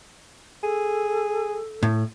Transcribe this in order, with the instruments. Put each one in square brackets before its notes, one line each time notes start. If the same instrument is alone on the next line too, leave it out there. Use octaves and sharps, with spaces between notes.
[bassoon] G#4 [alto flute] A4
[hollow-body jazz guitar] A2